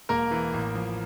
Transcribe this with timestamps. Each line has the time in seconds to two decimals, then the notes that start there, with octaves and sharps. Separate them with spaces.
0.09 E1 A#3 A#4
0.31 E3
0.54 A1
0.75 F3